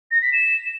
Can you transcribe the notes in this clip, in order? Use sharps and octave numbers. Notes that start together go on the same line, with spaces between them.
A#6
B6
E7